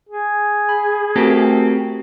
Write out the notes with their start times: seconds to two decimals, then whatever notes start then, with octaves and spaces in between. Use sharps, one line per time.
0.09 G#4
0.69 B5
1.16 A3 C4 F#4 G4 A4 A#4